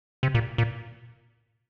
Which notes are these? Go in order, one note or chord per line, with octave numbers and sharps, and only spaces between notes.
C3
A#2
A#2